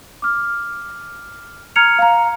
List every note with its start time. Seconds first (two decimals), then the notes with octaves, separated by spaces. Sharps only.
0.22 D6 F6
1.76 A#5 F6 G#6 C#7 F7
1.99 F5 A#5